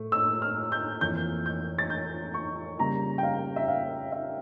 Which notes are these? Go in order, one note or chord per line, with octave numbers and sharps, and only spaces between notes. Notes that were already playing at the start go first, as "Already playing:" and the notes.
Already playing: A2 A3
E6
F6
G6
F2 E3 A#3 G6
G6
A6
G6
C#6
C#3 G3 A#3 A#5
G5
F5
E5
F5
E5